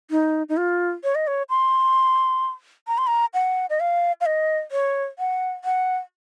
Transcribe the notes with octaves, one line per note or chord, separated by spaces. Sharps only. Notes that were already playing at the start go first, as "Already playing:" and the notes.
D#4
D#4
F4
C#5
D#5
C#5
C6
A#5
C6
A#5
F#5
D#5
F5
F5
D#5
C#5
F#5
F#5